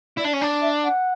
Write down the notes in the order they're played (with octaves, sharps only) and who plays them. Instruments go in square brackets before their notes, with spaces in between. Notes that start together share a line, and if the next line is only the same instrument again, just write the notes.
[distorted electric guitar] E4 [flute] D5
[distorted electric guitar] D4
C#4
[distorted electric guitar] D4 [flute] D5
[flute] E5
F#5